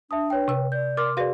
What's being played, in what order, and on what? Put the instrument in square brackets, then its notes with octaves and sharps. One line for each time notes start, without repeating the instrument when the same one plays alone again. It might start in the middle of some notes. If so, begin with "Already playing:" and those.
[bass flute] D4 [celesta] E5 A5 D#6
[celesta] B4 C#5 G5
[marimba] C3 E6
[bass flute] D5 [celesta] G6
[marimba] A#4 [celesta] C6 D6 F6
[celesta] F#4 G#4 D5 [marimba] B4 F5